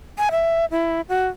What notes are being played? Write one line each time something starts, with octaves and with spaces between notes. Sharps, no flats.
G#5
E5
E4
F#4